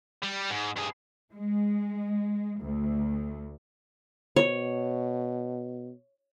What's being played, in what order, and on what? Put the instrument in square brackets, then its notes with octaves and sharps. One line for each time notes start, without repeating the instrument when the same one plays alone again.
[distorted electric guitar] G3
G#2
G2 G#4
[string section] G#3
D2
[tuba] B2 [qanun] C#5